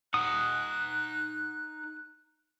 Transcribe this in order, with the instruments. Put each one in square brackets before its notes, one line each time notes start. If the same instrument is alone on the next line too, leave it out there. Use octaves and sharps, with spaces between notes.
[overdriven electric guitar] D#4 F#5 [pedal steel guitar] D#6 [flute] F#6